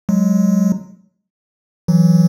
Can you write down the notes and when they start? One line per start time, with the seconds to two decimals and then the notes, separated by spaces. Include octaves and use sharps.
0.09 F#3 G#3
1.88 E3 F#3